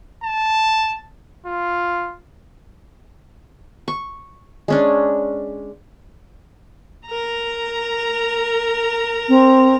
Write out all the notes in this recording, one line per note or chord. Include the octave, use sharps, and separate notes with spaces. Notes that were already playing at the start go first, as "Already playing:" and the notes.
A5
F4
C#6
G#3 C#4 D4
A#4 A#5
C4